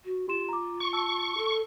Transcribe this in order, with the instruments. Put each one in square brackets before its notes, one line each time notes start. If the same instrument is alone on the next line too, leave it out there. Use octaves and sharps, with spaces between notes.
[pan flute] F#4
[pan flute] F4 [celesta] G4 C6 E7
[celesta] A#5 D6
[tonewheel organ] C#6
[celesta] A5 E6
[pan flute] A4